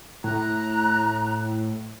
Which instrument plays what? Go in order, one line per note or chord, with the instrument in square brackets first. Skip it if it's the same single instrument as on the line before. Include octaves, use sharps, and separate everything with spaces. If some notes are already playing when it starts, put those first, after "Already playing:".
[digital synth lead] A2 [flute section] A#5 F#6